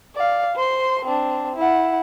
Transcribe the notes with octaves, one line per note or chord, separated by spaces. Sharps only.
D5 F5
C5 C6
C4 D4
E4 F#5